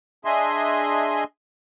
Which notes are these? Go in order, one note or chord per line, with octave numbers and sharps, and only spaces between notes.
D4 G#4 D#5 E5 G#5 C6